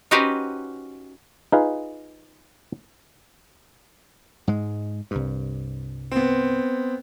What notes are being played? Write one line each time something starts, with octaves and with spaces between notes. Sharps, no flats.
C#4 D#4 F#4 G4 B4 C5
D#4 F4 G#4 B4 F5
G#2 G#3
C2 G2
B3 C4